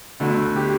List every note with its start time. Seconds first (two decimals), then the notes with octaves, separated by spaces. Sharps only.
0.20 D2 D3 A3
0.56 G4